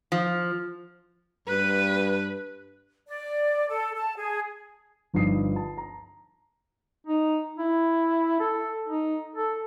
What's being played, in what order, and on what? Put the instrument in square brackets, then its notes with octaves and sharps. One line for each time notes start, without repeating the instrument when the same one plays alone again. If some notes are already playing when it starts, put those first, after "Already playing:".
[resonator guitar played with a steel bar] F3
[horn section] G2 [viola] B4
[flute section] D5
A4
A5
G#4
[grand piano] G1 G2 F3 D#4 D#6 C7
A5
A#5
[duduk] D#4
E4
A4
D#4
A4